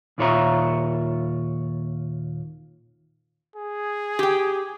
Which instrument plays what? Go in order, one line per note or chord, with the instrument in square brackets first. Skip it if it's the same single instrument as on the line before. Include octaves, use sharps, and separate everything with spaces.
[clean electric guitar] D#2 A#2 F4 C#5 E5 A#5
[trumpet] G#4
[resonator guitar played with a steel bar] G4 G5